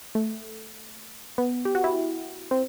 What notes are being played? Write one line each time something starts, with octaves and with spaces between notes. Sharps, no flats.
A3
B3
G4
F#4
E4
C4